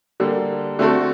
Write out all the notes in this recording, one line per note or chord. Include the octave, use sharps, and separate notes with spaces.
D3 G3 A#3
D3 A3 C4 F#4 A4